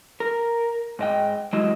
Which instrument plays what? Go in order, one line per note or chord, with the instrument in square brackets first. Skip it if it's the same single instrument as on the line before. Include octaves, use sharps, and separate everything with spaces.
[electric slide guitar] A#4
G#2 D#5 G5
E3 F#3 G#3 E4 G4 D#5